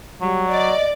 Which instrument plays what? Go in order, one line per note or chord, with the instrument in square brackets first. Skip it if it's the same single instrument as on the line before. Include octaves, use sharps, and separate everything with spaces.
[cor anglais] F#3 [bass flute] G3
[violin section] D5 [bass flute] D#5